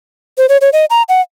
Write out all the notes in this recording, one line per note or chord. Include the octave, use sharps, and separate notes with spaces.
C5
C#5
C#5
D#5
A#5
F#5